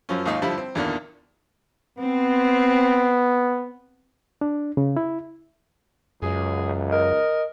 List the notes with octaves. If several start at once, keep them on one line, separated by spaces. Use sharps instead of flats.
F#2 F3 C#4
D#2 G#2 D#4 F4
D3 F3 G3 E4
C4
E2 A#2 D3 D#3
B3 C4
D4
C#3
E4
C#2 F#2 G#4
A#4 D#5